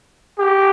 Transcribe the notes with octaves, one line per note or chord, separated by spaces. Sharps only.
G4